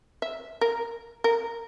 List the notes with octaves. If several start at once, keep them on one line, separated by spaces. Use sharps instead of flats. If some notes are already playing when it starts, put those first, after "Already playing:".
E5
A#4
A#4